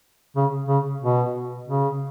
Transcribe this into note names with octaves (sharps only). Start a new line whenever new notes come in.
C#3
C#3
B2
C#3